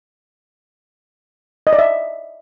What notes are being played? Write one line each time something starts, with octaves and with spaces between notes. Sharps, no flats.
D#5
D5
E5